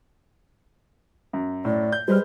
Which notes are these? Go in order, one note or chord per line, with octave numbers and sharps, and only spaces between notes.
F#2
A2 D5
G6
G3 G#3 B4 C5 F6